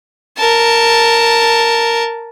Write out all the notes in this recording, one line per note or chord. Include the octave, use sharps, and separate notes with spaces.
A#4 A5